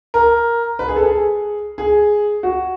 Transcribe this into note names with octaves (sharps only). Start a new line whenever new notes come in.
A#4
B4
G#4
A4
G#4
G#4
F#4